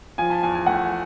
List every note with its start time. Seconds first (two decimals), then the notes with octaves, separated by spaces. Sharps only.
0.18 F3 G#5
0.30 A5
0.43 E2 G#5
0.55 G#5
0.66 A3 F#5